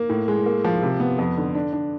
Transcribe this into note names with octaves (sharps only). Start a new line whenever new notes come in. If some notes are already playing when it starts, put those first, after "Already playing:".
Already playing: A#3
A2
G#3
A#3
F3
C3
B3
F2
D3
D4
D4